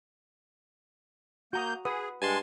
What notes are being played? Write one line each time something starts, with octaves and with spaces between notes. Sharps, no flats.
A#3 F#4 A#5 D#6 G6
G#4 B4 F#5 D#6
G2 G#3 G#5 A5 C6